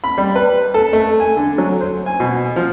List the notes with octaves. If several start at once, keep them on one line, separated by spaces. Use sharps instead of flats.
B5
G3
B4
A4
A3
G#5
D3
F#3
C5
G#5
B2
F3